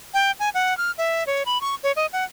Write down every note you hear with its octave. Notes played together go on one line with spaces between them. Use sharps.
G5
G#5
F#5
F6
E5
C#5
B5
C#6
C#5
D#5
F#5